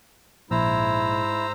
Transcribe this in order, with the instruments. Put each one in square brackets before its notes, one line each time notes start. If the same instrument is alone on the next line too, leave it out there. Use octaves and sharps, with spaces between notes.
[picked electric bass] A#1 [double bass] G#2 [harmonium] E4 [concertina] C5 A#5 E6